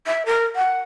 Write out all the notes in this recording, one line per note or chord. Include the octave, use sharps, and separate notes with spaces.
E5
A#4
F#5